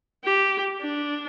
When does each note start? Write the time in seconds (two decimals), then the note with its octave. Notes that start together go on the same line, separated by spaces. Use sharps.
0.24 G4
0.82 D4